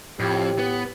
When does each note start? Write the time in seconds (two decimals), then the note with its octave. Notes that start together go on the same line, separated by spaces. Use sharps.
0.20 F2 A2 G4
0.59 B3